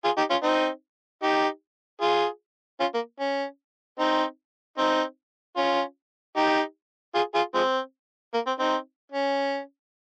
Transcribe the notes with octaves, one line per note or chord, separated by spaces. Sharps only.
F4 G#4
D#4 G4
C#4 F4
C4 D#4
D#4 G4
F4 G#4
C#4 F4
A#3
C#4
C4 D#4
C4 D#4
C#4 F4
D#4 G4
F4 G#4
F4 G#4
F3 G#3 C4
A#3
C4
C4 D#4
C#4